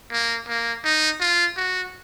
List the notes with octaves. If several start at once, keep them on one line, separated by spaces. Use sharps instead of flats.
A#3
A#3
D#4
F4
F#4